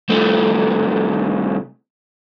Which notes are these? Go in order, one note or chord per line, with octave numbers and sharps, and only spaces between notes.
C2 A3